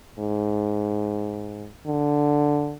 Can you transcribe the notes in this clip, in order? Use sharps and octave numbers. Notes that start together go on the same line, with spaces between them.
G#2
D3